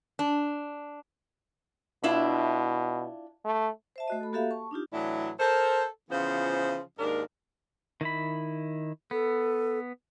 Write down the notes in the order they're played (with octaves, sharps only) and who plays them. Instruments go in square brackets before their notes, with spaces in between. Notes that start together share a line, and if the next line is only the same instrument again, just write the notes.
[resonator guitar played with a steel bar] D4
[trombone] B2 [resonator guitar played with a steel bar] D4 E4 F4
[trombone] A3
[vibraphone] C5 E5 A5
A3 F#4 D#5
A4 B5
A#3 F#4 G4 A4 E5 F5
A5 C#6
D4 D#4 F4 G4
[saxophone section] A2 E3 F#3 D4 E4
A4 A#4 C5
C#3 E3 F3 B3 F4 C5
D#2 G#2 D4 A#4
[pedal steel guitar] D#3 E4 B5
[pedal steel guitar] B3 [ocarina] A4